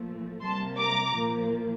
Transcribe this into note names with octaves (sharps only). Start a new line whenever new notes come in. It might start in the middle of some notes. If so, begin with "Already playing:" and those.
Already playing: A#2 F3 A3
C3 G3 A#3 A5 C6
A#5 D6
A#2 F3 A#3